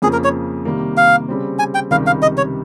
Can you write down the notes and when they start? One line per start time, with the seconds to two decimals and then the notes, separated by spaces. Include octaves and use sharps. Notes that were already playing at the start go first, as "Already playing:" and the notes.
0.02 F2 C#3 F3 A#3 G#4
0.13 A#4
0.24 C#5
0.65 C3 D#3 G3 A#3
0.97 F5
1.29 C#3 G3 C4
1.59 G#5
1.75 G5
1.91 C#2 C3 D#3 G3 F5
2.07 F5
2.22 D#5
2.37 C#5